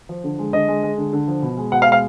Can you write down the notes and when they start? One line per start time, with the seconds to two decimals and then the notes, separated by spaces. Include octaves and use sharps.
0.09 F3
0.24 D3
0.39 G#3
0.53 D3 D#5
0.68 G#3
0.83 G#3
0.98 D3
1.13 D3
1.28 F3
1.42 B2
1.57 G#3
1.72 B2 F#5
1.82 F5
1.86 G#3
1.92 F5